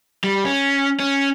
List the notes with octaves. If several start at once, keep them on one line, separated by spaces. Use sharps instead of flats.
G3
C#4
C#4